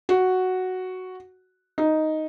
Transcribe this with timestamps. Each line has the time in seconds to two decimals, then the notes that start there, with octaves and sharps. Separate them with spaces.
0.09 F#4
1.78 D#4